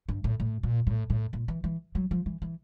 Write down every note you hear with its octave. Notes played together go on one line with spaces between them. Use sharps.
G2
A2
A2
A#2
A2
A2
A#2
E3
E3
F#3
F3
E3
E3